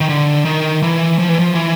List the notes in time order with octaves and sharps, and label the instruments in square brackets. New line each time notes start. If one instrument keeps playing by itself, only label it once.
[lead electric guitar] D#3
D3
D#3
E3
F3
E3
F3
E3